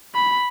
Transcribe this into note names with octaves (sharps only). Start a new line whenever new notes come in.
B5